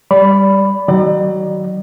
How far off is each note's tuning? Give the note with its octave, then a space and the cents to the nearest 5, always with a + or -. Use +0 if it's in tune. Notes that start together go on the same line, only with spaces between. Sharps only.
G3 +0 D5 -25 B5 +5
D#3 +25 F#3 +30 D5 +40